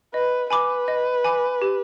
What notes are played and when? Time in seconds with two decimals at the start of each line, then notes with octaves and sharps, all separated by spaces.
0.14 B4 D#5
0.50 B4 G#5 B5 D6
0.88 D#5
1.24 G#5 B5 D6
1.62 G4